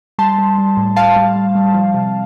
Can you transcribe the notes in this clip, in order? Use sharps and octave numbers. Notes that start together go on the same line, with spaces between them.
G3 A5 C6
G3
G3
A2
A2 F5 A5
G3
G3
G3
F3
C3